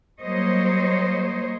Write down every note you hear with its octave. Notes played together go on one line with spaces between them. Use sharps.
F#3 G3 A#3 C5 C#5 D#5